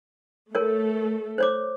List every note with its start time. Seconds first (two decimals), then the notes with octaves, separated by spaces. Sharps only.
0.55 A3 A4 A#4 C#5
1.38 C5 C#5 D6